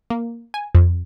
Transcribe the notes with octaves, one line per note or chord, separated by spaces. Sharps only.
A#3
G#5
F2